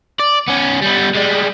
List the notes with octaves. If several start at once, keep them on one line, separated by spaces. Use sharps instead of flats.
D5
B3 C#4
G3 B3
G3 G#3